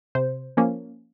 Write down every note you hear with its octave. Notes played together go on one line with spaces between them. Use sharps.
C3 C5
F3 A#3 C#4